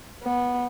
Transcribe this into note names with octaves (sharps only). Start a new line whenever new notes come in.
B3